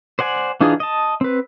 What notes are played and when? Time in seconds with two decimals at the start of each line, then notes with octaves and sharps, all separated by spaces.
0.19 C5 D5 F#5 G#5
0.61 E3 D4 D#4 F4 G#4
0.80 D#5 A5
1.21 C4 B4